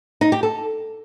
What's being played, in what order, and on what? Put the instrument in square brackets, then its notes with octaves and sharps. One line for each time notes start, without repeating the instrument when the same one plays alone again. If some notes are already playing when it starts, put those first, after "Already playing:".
[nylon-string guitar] D#4
G4
A4